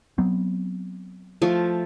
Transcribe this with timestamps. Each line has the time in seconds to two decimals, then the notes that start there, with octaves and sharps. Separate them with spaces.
0.18 F#3 B3 C4
1.42 F3 A3